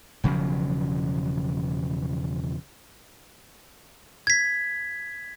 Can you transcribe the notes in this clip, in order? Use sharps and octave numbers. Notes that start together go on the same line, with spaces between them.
E1 C#3 F3 F#3
G#6 B6